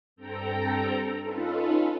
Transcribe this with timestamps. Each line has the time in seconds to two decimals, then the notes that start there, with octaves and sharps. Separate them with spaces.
0.16 G2 C4 A4 G5 A#5
1.22 C#4 D#4 F4 A4 B4